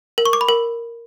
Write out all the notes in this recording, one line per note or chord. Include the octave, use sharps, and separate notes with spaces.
A#4
C#6
D6
B5
A#4